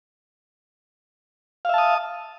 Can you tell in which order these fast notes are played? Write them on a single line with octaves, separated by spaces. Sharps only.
F5 E5 A5 D#6